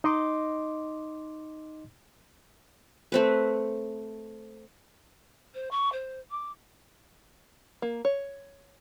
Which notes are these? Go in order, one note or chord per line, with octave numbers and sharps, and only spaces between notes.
D#4 D#5 C6 D6
A3 C4 B4
C5
C#6
C5
D6
A#3
C#5